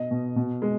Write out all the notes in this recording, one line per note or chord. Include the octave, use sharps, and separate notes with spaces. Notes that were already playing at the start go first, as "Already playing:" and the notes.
Already playing: B2 D#5
B2
B2
G#3